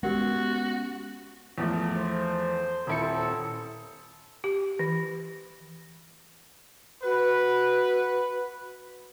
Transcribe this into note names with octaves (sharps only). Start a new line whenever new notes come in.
G#3 B3 C#4 F#4 G4 A#4 F#5
E2 F3 A3
C5
D#1 C4 E4 A4 C#7
G4
E3
F#4 B4